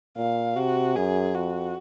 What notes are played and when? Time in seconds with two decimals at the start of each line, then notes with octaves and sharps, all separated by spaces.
0.17 A#2 F5
0.56 C3 F#4
0.96 F#2 G#4
1.34 F2 F#4